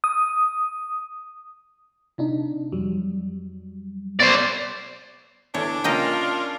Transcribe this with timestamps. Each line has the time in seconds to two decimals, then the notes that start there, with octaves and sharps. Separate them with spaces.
0.04 D#6
2.18 C3 D4 D#4
2.72 F2 F#3 G3
4.20 B3 C5 D5
5.54 E2 D3 D4 C#5
5.84 C#3 A#3 C#4 F4 A#4 D#5 G5